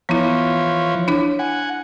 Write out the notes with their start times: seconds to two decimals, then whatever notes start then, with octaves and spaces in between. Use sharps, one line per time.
0.09 E3 F3 B3 E4 C#5
1.08 D4 E4 C#5
1.39 F#5 G#5